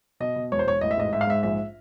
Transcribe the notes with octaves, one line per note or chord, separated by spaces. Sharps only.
B2 D#5
B2
E1 C#5
C5
E1 C#5
A1 D#5
E5
G#2 D#5
G#2 E5
F5
G#2 E5
A#1 E5